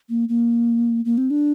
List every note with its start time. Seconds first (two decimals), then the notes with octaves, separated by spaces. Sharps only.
0.09 A#3
0.29 A#3
1.05 A#3
1.18 C4
1.30 D4